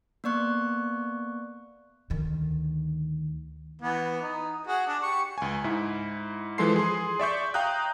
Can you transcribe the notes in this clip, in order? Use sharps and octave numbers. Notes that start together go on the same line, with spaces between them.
A#3 B3 D5 C#6 F#6
D2 D#3
E3 B3
D#4
F#4 G#4 F#5
D4
G4 C#6
C#2 G#5
G#2 E4
E3 F3 G#3 A4 C6 C7
G#4 C6
D5 E5 C#6 G6
F5 G5 A#5 D#6 F#6 G6